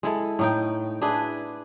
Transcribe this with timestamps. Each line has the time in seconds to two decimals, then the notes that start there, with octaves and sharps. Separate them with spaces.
0.03 G#3 E4 A4
0.39 A2 D#4 G5
1.02 D4 E4 G#4 B4